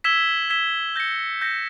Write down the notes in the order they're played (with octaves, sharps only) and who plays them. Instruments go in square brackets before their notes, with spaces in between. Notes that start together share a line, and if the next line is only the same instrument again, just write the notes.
[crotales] E6 G#6 B6 E7 G7
E6 G#6 B6 E7 G7
G6 A#6 C#7
G6 A#6 C#7